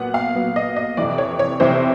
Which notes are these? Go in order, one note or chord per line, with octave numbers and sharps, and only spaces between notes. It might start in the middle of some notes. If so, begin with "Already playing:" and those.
Already playing: A#2 F#3 B3 F#5
F5
A#2 F#3 B3
D#5
D#5
F2 C3 E3 D5
C#5
C#5
F2 C3 E3 C5